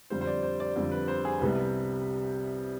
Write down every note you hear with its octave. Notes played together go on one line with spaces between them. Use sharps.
F2 D3 G3 C5
C5
D5
C5
D5
F2 D3 G3
B4
C5
G#4
C2 C3 G3 B3